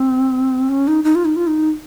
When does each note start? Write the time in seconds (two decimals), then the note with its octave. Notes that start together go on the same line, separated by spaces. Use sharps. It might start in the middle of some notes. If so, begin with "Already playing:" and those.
Already playing: C4
0.69 C#4
0.88 D#4
1.04 D#4
1.15 F4
1.25 D#4
1.36 F4
1.47 D#4